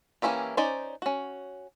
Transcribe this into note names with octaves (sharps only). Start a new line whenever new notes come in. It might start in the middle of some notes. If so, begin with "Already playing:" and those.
E3 A#3 C#4 E4 G4
C#4 D#4 C5 D5
C#4 F#4